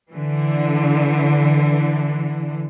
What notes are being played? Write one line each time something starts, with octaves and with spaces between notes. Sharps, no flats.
D3 E3